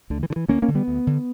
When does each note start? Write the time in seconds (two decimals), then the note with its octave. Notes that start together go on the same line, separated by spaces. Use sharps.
0.10 D2 D3
0.23 E3
0.30 D3
0.36 E3
0.48 D2 A#3 C#4
0.62 A#3 C#4
0.68 D3
0.75 G3 B3
0.88 D2
1.07 D3